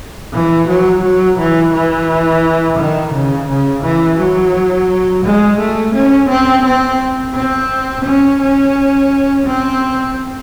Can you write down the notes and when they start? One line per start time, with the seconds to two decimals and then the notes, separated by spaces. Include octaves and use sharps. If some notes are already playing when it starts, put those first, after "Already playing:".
0.33 E3
0.68 F#3
1.03 F#3
1.39 E3
1.72 E3
2.78 D#3
3.13 C#3
3.48 C#3
3.83 E3
4.20 F#3
5.25 G#3
5.59 A3
5.94 C#4
6.29 C4
6.65 C4
7.35 C4
8.05 C#4
8.41 C#4
9.46 C4